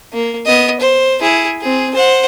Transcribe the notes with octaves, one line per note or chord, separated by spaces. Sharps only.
A#3
B3 D#5
C5
E4 G#4
C4 G#4
C5 F#5